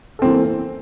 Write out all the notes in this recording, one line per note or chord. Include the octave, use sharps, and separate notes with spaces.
E3 A#3 C4 A4